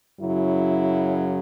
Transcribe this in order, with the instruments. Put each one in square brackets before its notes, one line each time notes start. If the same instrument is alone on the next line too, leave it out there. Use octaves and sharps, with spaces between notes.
[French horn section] F#2 C#3 F#3 E4